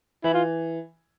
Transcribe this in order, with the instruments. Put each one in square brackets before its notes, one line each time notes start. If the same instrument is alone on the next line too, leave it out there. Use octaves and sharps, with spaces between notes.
[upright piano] E3 [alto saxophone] E4
[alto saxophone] F4